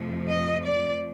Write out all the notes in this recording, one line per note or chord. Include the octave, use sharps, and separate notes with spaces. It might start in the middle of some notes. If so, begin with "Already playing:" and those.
Already playing: F2 C3 F3 A3
D#5
D5